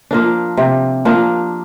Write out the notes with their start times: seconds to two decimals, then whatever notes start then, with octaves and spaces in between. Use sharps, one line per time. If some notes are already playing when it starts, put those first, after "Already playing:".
0.11 F3 A#3 D4
0.57 C3
1.05 F3 A#3 D4